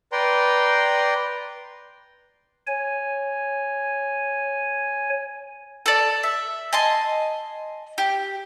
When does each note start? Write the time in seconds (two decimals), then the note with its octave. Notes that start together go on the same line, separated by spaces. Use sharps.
0.12 B4 D5 G5 A#5 C6
2.67 C#5 G#5
5.86 A4 D5
6.23 E5
6.73 D#5 G#5 A5 C6
7.98 G4